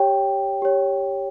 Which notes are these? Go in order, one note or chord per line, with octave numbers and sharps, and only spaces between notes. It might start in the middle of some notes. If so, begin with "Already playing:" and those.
Already playing: G4 C#5 G5
G4 C#5